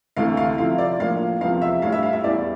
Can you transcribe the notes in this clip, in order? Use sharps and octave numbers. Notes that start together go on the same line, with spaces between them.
D2 C3 E3 A3 E4 F5
F5
C3 F3 C4 E4 F5
D5
A2 F3 A#3 D4 F5
E2 C3 F3 F5
E5
A2 G3 D4 F5
E5
F5
E5
E2 E3 G3 D5